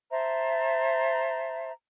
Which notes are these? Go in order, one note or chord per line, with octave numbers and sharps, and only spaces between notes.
C5 E5 A5 A#5